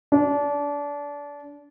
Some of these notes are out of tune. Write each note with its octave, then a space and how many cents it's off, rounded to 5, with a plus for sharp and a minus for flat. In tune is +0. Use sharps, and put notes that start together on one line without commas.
D4 -25